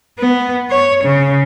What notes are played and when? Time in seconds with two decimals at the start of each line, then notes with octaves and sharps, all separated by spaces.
0.19 B3
0.70 C#5
1.04 C#3